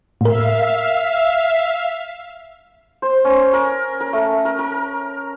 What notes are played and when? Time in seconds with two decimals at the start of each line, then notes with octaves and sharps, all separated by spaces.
0.21 A2 A#4 E5 F5
3.02 C5
3.25 C#4
3.53 A#4
4.00 A#4
4.13 A3
4.45 A#4
4.59 A#4